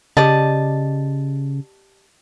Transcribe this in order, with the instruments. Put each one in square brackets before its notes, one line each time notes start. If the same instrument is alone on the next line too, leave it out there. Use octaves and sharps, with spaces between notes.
[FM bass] C#3 [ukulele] G4 D5 D#5 [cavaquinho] A5